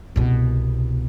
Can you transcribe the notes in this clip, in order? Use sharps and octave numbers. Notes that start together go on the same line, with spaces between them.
C2 B2